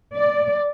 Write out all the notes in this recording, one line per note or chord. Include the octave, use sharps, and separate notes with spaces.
D5